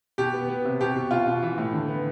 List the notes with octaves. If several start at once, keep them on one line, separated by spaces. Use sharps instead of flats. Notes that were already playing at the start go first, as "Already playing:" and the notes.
B2 G4
B3
B3
C3
B2 G4
B2
B2 F4
B2
E3
A2
D3
B3